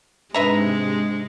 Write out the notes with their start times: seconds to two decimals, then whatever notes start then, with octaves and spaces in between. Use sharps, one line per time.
0.34 G#2 C3 G#3 D4 B4 E5 A#5